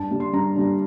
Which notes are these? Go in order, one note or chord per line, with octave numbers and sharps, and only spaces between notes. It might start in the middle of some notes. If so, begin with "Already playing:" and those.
Already playing: G2 A5
D3 G3 D4
C6
G2 A#5
D3 G3 D4